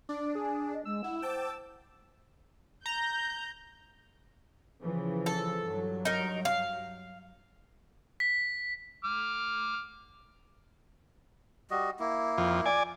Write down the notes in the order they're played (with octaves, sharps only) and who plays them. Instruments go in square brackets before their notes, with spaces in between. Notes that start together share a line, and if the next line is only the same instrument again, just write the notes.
[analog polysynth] D4 [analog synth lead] D5
[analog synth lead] G#4
[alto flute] D#5
[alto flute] G#3 [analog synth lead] E6
[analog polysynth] E4 [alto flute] F#5
[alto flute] C5 [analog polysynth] G5 A5 D6
[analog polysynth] A#5 [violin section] G6
[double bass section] C#3 E3 F3
[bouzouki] A4
[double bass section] G2 F#3
[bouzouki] D#4 A#4
F5
[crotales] B6
[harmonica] D6 F6
[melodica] G3 F#4 D#5
A#3 E4
[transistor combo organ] F2
D5 G#5